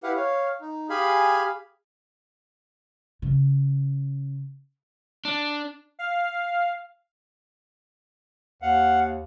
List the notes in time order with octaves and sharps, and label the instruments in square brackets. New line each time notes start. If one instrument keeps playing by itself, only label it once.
[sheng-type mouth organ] E4 G4 B4 F5 F#5
C#5 F5
D#4
G4 G#4 F5 G#5 B5
[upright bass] C#3
[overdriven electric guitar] D4
[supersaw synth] F5
[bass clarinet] D#2 [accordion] F5 F#5